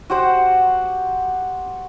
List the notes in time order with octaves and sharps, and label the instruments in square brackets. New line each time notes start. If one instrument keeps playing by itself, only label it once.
[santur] F#4 G4 C5 F#5